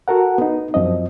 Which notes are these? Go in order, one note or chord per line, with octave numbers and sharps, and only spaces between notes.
F#4 A4 A#4 F#5
B3 D#4
F#2 F3 C4 D#5